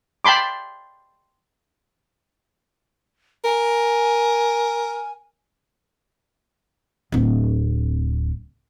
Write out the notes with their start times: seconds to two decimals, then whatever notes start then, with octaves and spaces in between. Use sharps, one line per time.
0.25 G5 A5 B5 C6 D6
3.45 A#4 G#5
7.12 D1 C4